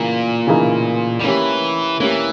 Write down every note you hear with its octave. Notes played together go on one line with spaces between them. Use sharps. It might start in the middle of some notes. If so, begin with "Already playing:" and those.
Already playing: A#2 C#3 E3 A#3
C#3 E3 A#3 D#4 G#4
G3
E3 A#3 C#4 G4
E3 A#3 C#4 G4